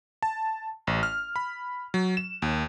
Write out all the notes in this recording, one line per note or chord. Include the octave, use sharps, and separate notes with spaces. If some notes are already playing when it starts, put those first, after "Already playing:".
A5
A1
F6
B5
F#3
E7
D#2